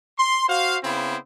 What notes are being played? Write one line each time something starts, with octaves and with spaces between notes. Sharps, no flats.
C6
F#4 C5 F5
C#3 B3 C4 E4